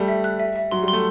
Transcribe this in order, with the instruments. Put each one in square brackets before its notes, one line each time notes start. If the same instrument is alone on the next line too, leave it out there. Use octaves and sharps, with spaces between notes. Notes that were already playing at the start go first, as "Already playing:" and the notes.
Already playing: [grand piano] G3 A3
[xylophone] E5
F#6
E5
E5
[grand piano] F#3 [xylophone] C6
[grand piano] G3
[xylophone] C6
[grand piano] A3